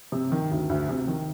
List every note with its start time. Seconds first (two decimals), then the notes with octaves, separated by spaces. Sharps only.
0.12 C3
0.32 D#3
0.51 D2
0.70 D2
0.89 C3
1.08 D#3